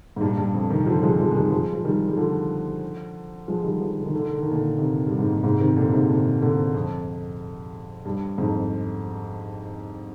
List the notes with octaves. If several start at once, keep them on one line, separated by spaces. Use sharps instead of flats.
G#2
G2 A#2
G2
F2
C3 D#3
D3 F3
F3 G#3
F3 G#3
G#3
D#3 G3
F3 G#3
F3
D#3 G3
G3
D3 F3
F3 G#3
D#3 G3
D3 F3
D3
D#3
D3
D#3
D3
D#3
A#2 D3
C3 D#3
G2
G#2
A#2
G#2 C3
C3 D#3
A#2 D3
G#2 C3
A#2 D3
A#2 D3
F2
G2
F2 G#2